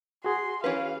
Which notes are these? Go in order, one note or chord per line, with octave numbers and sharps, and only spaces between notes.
F#4 G#4 C6
E3 C#4 B4 F5